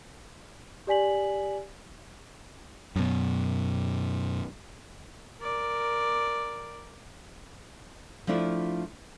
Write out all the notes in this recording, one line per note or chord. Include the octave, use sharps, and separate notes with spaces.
G4 D5 G#5 B6 F#7
F#2 B2
A#4 D5
F3 A3 D4 E4 F4